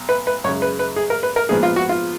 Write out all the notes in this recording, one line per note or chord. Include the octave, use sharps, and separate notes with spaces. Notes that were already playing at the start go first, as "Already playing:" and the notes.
Already playing: B1
B4
B4
F#2 C#3 G#3 C#5
B4
B4
G#4
A#4
B4
A#4
A#1 G#2 F3 B3 G#4
F4
F#4
F4